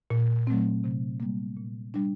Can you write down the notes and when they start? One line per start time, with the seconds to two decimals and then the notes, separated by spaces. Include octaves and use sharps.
0.10 A#2
0.47 F#3 A3 C4
0.84 C3
1.20 G3 A#3
1.57 A#2
1.94 G3 D4